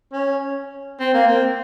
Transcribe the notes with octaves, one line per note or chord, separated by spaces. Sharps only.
C#4
C4
A#3
C4